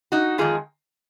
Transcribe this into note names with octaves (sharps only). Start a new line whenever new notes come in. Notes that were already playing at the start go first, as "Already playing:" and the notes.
D#4 F#4
F2 D#3 G#3 F4 G#4